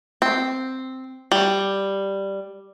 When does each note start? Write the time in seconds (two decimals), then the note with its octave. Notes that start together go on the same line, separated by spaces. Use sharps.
0.22 C4
1.32 G3